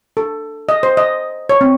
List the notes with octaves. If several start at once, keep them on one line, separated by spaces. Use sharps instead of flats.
A4
D#5
C5
D#5
C#5
C4